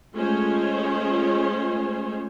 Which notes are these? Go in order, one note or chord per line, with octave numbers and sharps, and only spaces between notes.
G#3 A3 C#4 F4 C5 C#5